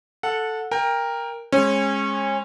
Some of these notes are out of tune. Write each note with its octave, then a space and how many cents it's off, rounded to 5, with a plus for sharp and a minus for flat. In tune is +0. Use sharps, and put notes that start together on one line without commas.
A4 +0 F#5 -20
A#4 +0 G5 +25
G#3 +0 C#4 -25